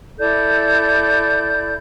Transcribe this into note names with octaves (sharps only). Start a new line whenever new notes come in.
E4 A4 D5 G6